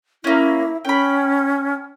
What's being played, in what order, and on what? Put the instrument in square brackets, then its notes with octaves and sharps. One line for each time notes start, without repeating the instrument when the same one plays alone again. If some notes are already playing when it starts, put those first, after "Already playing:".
[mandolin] A#3 C#4 [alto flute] E4
[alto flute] C#4 [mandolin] G5 B5